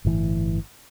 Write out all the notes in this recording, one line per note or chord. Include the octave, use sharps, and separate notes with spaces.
G1 A2 E3